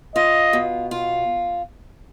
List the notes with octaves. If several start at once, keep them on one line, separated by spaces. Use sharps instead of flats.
F4 D#5
B2
F4